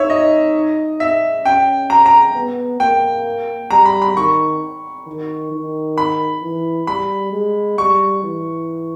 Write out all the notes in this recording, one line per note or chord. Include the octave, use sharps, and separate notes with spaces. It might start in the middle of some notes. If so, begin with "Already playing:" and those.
Already playing: D#4 C#5 E5
D#5
E5
C#4 G5
A#5
A#5
B3
A#3 G5
G3 A#5
B5
B5
D#3 C#6
D#3
D#3
B5
E3
G3 B5
G#3
G3 C#6
E3